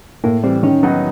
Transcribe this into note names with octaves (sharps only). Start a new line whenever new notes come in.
A2 A#3
E3 G3 C4
D#3 C#4
F#3 B3 D#4 F#4